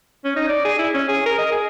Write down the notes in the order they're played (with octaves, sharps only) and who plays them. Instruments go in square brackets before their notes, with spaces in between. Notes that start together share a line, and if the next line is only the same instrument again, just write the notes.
[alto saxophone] C#4
D#4
D5
G#4
E4
C#4
G#4
A#4
D#5
G#4